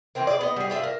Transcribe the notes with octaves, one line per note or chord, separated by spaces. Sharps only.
E3 F3 C4 A#4
G#4 D5
B3 D#5
G3 G#4
D4 F4 E5
A#4